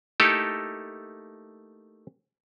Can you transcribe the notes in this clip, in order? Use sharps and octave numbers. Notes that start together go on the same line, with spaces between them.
A3 A#3 D#4 E4 G4 A4